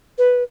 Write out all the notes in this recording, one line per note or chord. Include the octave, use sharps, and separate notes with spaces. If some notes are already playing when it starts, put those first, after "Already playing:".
B4